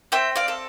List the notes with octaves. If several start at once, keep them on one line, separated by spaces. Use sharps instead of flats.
C4 E5 G5
D5 F5
A4